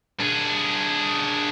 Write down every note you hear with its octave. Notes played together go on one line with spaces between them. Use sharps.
D4 G#4